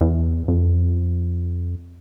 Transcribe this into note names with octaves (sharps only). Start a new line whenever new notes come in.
E2
F2